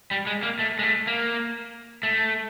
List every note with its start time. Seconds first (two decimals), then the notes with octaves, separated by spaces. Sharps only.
0.11 G3
0.27 G#3
0.43 A#3
0.59 A3
0.79 G#3
0.83 A3
1.07 A#3
2.03 A3